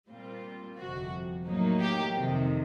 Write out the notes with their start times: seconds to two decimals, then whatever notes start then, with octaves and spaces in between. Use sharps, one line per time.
0.09 A#2 G3 C4 F4
0.77 G1 F2 C3 F#4
1.47 A2 F#3 A#3 D#4
1.80 G4
2.15 F2 C3 D#3